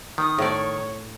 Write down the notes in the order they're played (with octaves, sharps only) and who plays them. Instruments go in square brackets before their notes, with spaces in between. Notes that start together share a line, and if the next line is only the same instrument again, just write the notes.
[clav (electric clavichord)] D#3 [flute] D#6
[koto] A2 D5 [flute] C#5